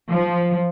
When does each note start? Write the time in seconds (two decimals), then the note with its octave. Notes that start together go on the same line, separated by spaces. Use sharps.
0.11 F3